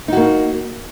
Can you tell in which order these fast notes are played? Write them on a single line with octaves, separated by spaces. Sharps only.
D#4 F#4 A#3